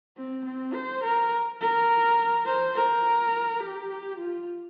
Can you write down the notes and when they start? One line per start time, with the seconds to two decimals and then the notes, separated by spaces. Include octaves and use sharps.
0.17 C4
0.45 C4
0.74 C5
1.03 A#4
1.61 A#4
2.46 C5
2.75 A#4
3.60 G4
4.18 F4